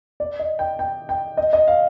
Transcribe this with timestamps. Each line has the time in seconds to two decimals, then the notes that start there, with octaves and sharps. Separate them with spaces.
0.20 D5
0.39 D#5
0.59 G5
0.79 G5
1.09 G5
1.37 D#5
1.53 D#5
1.68 F5